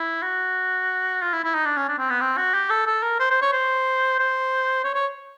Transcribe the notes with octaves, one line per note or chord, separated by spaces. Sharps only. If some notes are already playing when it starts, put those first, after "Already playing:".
Already playing: E4
F#4
F4
E4
E4
D#4
D4
C#4
D4
C4
B3
C4
F#4
G4
A4
A4
A#4
C5
C5
C#5
C5
C5
C#5
C#5